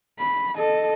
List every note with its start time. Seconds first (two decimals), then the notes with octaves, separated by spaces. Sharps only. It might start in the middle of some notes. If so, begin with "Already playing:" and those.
0.19 B5
0.55 A4 D#5